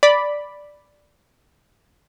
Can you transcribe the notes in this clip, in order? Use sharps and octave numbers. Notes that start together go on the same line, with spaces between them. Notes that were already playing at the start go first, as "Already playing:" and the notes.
D5 B5